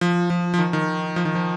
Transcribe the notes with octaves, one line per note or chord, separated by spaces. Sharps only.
F3
F3
F3
D#3
D#3
F3
D#3
F3